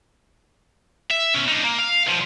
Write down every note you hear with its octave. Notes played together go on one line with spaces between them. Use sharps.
E5
B2 C#4
D4 D#4
A#3
F5
B1 F3